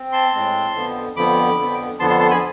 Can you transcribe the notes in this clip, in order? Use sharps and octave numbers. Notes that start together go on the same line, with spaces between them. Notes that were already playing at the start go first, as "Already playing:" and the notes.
Already playing: C4
A5 C6
A2 G#3 C4
F2 D3 F3 B3
F2 D3 F3 B3 B5 D6
F2 D3 F3 B3
F2 D3 F3 B3 A5 C6
A5 C6
A5 C6
G#5 B5